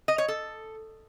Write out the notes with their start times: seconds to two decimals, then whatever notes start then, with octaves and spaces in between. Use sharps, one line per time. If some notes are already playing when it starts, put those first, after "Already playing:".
0.08 D#5
0.18 C#5
0.28 A4